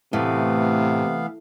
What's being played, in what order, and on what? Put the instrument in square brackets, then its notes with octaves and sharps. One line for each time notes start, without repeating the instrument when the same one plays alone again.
[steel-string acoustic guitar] A2 [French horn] C3 [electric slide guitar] E3 A3 [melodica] B3 F5